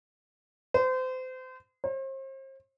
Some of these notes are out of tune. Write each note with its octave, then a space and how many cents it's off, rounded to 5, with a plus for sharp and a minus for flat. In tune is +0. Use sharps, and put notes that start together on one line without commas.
C5 -30
C5 +40